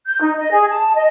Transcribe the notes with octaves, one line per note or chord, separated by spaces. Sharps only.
G6
D#4
D#5
G#4
A5
D#5